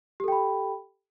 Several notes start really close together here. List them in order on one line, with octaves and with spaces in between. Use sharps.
G4 A4 G5 B5